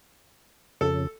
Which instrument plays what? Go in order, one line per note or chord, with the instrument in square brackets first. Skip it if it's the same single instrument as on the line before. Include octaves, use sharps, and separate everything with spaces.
[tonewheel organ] F2 C#3 [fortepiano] A4